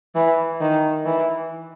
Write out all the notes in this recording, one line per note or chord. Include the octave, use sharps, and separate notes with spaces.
E3
D#3
E3